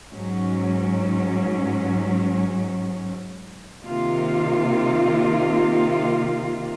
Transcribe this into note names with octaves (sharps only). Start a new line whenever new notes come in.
G#2 F#3 C#4
C3 D#3 A#3 F4